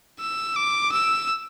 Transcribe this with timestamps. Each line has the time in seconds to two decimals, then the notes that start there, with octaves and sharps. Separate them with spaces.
0.20 E6
0.56 D6
0.92 E6